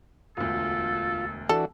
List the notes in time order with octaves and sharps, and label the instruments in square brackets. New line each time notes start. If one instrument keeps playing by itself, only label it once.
[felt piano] E1 D2 [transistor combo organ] F4 [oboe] A4
[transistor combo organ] E3 D4 F#4 [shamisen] A4